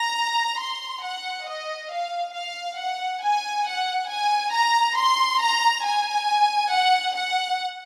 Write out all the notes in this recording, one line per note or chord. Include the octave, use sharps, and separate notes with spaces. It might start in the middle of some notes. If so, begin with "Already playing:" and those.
Already playing: A#5
C6
F#5
D#5
F5
F5
F#5
G#5
F#5
G#5
A#5
C6
A#5
G#5
F#5
F#5